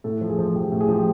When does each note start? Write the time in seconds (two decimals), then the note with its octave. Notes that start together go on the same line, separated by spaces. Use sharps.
0.04 A2 A4
0.21 F3
0.29 G#4
0.39 F3
0.56 F3 G4
0.72 A2
0.80 G#4
0.89 F3
0.94 G4